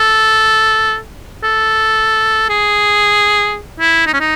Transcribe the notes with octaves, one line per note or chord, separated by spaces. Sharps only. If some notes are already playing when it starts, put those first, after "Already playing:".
Already playing: A4
A4
G#4
E4
D#4
C#4
D#4